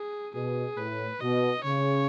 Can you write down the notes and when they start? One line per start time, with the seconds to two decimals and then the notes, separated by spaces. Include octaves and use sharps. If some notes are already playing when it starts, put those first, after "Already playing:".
Already playing: G#4
0.35 B2 G#4
0.77 A2 B4
1.21 B2 D#5
1.64 C#3 C#5